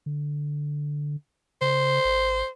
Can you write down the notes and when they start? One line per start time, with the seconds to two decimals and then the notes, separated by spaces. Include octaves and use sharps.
0.06 D3
1.61 C#3 C5
2.05 G#1